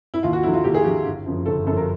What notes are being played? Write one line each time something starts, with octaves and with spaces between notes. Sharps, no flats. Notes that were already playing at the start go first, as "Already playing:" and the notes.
E4
D#2 F4
F#4
D3 F#3 E4
F4
D#2 G4
G#4
D3 F#3 G4
G1
F#2 C#3 F3
G1 A4
F#2 C#3 F3 A4
A#4